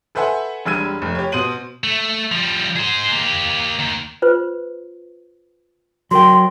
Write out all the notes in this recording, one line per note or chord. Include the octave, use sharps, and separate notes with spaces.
A4 B4 C5 E5 F#5 G#5
E1 G3 D4 E6 G#6 D#7
F1
G4 C#5
B2 C5 D#7 F#7
A3
F3 G3
G#4 C5
A#3 G4
D#3 A#3
F4 B4 C5
F#3 A#4 G5 C6